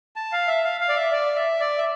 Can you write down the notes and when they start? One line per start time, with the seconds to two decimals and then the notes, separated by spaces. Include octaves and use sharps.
0.16 A5
0.32 F5
0.48 E5
0.64 F5
0.81 F5
0.89 D5
0.96 E5
1.12 D5
1.36 E5
1.60 D5
1.78 E5